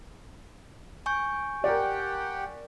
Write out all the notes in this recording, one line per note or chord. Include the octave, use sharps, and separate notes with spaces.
G#5 C#6 G6
G4 A#4 D5 F#5 G5